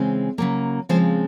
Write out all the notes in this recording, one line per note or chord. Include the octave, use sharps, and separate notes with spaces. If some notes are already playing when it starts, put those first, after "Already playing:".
Already playing: C#3 E3 G#3 C4
C#3 F#3 A#3
C#3 F3 G#3 C4 C5